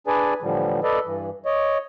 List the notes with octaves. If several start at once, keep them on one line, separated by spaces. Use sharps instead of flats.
D4 G#4 B4 D5 G#5
A2 D3 E3 F3 G3
A4 B4 D5 D#5
G2 E3
C#5 D#5